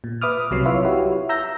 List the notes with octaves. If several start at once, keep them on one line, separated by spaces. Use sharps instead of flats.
A#2
B4 E5 D6 D#6 F6
C2 C3 F#3 C#5 C7
E4 F4 B4 C#5 E5
E4 F#4 G4 B4 C#5
E5 A#5 E6 G6 A#6